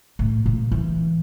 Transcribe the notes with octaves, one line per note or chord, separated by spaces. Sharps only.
A2
A#2
E3